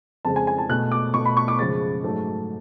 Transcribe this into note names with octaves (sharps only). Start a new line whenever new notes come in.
F2 C#3 G#3 A5
G#5
G#5
A5
B2 A3 F#6
D6
B2 A3 C#6
B5
C#6
D6
F#2 C#3 F3 G#3 A6
G#2 F#3 A3